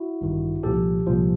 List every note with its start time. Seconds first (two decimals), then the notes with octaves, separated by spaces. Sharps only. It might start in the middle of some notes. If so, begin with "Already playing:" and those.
Already playing: E4 F#4
0.21 A1 G2 D#3
0.63 C2 A#2 F3 G4 A4
1.06 C2 A#2 F3